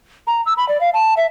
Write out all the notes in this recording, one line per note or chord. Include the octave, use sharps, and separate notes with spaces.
A#5
E6
B5
D5
F5
A5
E5